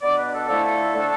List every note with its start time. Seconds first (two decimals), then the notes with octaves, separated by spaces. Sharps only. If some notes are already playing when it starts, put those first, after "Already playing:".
0.02 B2 B3 D4 D5
0.17 B4
0.33 A4
0.48 D3 F3 A3 E4 A4
0.93 D3 A3 D4